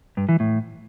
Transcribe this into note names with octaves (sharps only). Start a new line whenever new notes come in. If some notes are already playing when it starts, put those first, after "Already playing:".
G2
E3
A2